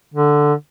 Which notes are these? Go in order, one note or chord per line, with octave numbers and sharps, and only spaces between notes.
D3